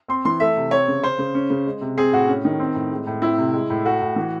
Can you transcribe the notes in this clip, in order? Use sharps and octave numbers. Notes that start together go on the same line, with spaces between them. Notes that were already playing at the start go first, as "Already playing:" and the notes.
C4 C6
E3 C6
A3 E5
C3
C4 C#5
C#3
C#4 C5
C#3
C#4
C#3
G#3
C3
C4 G#4
A2 F#4
C#4
D#3
C4
A2
G#3
A2
C4 E4
C3
G#3
A2
A3 F#4
A2
E3